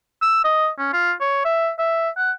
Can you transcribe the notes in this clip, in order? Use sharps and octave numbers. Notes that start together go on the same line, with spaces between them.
E6
D#5
C#4
F4
C#5
E5
E5
F#5